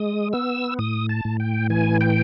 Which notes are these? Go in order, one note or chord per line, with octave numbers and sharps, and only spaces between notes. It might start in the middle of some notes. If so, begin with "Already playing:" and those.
Already playing: G#3 D#6
B3 E6
A2 D#6
A5
A2
G5
E3 G#5
G5